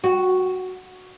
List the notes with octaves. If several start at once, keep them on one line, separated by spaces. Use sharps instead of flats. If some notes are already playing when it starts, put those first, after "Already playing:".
F#4